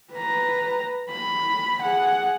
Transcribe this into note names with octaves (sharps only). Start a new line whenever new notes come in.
B4 A#5
B5
G#4 F#5